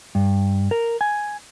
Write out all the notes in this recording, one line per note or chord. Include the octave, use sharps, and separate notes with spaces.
G2
A#4
G#5